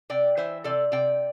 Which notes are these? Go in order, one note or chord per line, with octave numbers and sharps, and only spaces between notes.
C3 D5 G5
E3 C5 E5
C3 A4 D5
C3 D5 G5